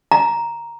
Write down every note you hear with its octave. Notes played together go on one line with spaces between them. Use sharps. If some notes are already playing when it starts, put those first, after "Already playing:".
A#5